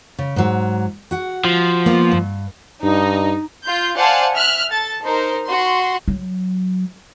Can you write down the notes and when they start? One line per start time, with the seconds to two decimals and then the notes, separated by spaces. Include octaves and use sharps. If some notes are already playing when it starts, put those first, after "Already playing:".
0.18 C#3
0.36 G#2 F#3
1.11 F#4 F#5
1.44 F3
1.86 A#3 B3 F4
2.12 G2
2.83 G2 D#4
3.65 F4 G6
3.97 C5 D5 F5 F#5 G#5 A5
4.35 E5 F6 F#6
4.71 A4 A5 A6
5.03 D#4 A#4 C5
5.46 F#4 C6
6.08 F#3